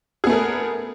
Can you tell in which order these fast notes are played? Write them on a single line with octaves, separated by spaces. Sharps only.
G#4 B3 A3 A#4